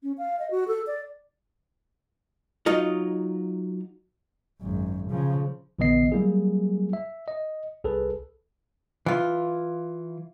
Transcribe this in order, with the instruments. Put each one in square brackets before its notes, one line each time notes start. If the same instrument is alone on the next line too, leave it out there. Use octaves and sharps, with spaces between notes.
[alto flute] C#4
F5
D#5
F#4
A4
D5
[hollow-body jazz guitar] F#3 D#4 F4 D#5
[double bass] G#1 F#2
C#3 F3
[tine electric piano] A#1 D3 E3 B3 D#5 C7
F#3 G3 A#3 E4 G#4
E5
D#5
C2 G#4 A4 B4
[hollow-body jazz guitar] E3 F4